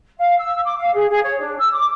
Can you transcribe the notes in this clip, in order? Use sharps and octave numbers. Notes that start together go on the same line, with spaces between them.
F5
E6
D6
F5
G#4
G#4
C#5
D4
E6
D6